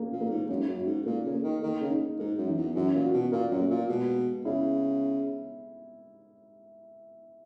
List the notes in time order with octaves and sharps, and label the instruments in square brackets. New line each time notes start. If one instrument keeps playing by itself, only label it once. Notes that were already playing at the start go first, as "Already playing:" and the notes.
Already playing: [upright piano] A#3 C#4 G#4
[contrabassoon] A#2
[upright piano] A#3
[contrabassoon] G#2
[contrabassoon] F#2 [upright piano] C#4
[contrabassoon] G#2
F#2
[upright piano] F#4
[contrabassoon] G#2
[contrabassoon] A#2 [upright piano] A#3
[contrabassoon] C#3
[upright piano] A#3
[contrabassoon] D#3
[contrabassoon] D#3 [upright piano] A#3
[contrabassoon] C#3
[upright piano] D#4
[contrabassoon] G#2 [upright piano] A#4
[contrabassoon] F#2
[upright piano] E3
[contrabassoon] E2
[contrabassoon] F#2 [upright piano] C#4
[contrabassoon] A#2
[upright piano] F#4
[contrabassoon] B2
[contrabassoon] A#2 [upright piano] A#4
[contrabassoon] F#2
[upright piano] A#3
[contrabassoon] A#2
[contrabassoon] B2 [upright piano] G#3
[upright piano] B3
[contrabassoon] C#3 [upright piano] E4